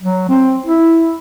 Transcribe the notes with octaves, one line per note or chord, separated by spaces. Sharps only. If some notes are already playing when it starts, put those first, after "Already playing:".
F#3
C4
E4